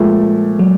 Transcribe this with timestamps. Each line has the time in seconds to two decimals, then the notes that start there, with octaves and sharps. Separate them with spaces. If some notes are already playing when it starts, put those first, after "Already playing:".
Already playing: A#2 F3 G#3 A3
0.59 F#3